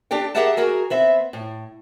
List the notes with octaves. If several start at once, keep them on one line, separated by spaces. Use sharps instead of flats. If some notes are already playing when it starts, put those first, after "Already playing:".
D4 G4 A4 G5
G4 G#4 A#4 E5 F#5 A5
F#4 G#4 A#4
B3 C4 E5
A2